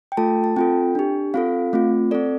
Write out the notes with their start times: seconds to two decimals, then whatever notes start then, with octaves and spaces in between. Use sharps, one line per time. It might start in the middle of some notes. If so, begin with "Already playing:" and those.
0.12 G5
0.17 A3 F4 A4 A5
0.44 A5
0.56 C4 F4 A4 G5
0.95 D4 G4
1.34 C4 F4 A4 F5
1.73 A3 C4 F4
2.11 C4 A4 D5